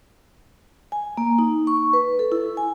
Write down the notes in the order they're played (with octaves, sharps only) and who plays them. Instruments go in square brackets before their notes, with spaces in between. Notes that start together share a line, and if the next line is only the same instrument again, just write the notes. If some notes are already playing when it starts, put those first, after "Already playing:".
[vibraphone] G#5
A#3
D#4
C#6
B4
A4
E4
G#5